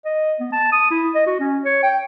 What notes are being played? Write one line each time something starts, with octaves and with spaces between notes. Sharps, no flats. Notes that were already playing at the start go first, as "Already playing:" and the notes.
D#5
B3
A5
D#6
E4
D#5
F#4
C#4
C#5
G5